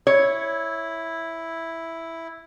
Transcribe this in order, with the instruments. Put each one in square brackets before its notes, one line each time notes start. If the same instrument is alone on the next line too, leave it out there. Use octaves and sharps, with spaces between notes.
[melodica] E4 [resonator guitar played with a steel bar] C#5